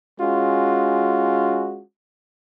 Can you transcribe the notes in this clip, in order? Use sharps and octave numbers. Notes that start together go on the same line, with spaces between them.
G#3 C#4 F4 F#4